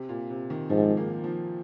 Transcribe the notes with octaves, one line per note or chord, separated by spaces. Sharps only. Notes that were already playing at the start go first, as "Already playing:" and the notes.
Already playing: C3
A#2
C3
D#3
G#2 F3
A#3
F3